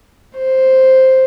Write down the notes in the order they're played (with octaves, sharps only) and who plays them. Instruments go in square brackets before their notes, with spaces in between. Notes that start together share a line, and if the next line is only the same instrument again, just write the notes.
[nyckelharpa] C5